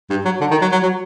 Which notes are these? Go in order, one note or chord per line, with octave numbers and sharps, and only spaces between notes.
G2
F#3
D3
D#3
F#3
F#3
F#3